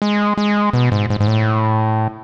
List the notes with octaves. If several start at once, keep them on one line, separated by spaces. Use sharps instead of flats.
G#3
G#3
B2
G#2
G#2
G#2
A2